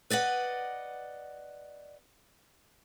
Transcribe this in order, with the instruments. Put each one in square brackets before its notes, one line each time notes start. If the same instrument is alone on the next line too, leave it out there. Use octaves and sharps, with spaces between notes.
[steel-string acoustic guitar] B4 D5 D#5 F#5